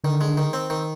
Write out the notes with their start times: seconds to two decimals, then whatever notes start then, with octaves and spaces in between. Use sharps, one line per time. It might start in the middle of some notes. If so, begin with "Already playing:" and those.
0.04 D3 D#3
0.21 G#3
0.38 D#3
0.53 C4
0.70 D#3